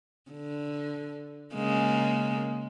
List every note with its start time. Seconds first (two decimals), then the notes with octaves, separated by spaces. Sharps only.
0.31 D3
1.55 C#3 G#3 A#3